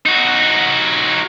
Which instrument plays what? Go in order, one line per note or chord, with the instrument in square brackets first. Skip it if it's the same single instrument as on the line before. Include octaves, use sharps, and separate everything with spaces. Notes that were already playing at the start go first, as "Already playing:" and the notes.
[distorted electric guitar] D#4 F#4